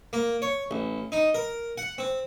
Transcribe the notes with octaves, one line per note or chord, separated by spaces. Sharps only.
A#3
C#5
A1
D#4
A#4
F#5
C4